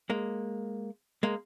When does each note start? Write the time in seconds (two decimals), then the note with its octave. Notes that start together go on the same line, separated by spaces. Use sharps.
0.10 G#3 A#3
1.23 G#3 A#3